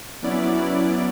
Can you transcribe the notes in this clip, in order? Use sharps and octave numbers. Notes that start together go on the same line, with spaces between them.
F#3 B3 C#4 E4 D5